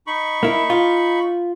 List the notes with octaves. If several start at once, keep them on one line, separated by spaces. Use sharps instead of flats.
D#4 B5 C#6
A#3 E4
F4